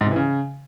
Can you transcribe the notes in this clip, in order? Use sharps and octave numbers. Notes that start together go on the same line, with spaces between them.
G#2
C3
E3
C#3